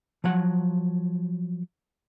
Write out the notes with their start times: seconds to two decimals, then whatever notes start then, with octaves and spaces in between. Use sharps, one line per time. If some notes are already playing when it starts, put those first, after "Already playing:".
0.24 F3 F#3 F#5